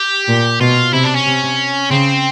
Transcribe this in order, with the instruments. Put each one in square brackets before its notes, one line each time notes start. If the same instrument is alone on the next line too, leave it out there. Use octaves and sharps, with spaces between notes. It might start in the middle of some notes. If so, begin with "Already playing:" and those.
Already playing: [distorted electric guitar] G4
[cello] A#2
[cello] B2 [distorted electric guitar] F4
[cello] C3 [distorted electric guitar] E4
[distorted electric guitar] D4
C#4
[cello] C3
[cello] C#3 [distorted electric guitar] C4